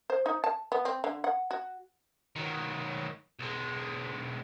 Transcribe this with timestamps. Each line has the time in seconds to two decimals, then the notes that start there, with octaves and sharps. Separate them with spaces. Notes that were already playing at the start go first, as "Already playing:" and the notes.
0.10 C5
0.26 D#4
0.44 A5
0.72 B3
0.85 C4
1.04 D3
1.24 F#5
1.51 F#4
2.36 D#3 F#3
3.40 B1 G#3